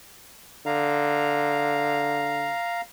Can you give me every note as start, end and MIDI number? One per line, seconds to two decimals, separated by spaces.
0.66 2.53 50
0.66 2.81 77
0.66 2.81 82